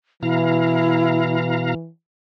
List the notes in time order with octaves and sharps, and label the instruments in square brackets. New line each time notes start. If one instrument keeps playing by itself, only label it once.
[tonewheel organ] B2 F5 A#5 [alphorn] E3 [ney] E4